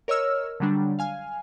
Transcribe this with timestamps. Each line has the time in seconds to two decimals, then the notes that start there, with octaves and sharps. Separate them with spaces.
0.08 A#4 C#5 D#5 E6 F6
0.60 D3 F#3 G3 D4
0.99 F5 G#5 F6